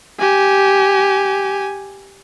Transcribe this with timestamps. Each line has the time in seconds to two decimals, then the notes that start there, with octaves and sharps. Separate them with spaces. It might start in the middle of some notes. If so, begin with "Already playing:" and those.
0.19 G4 G#5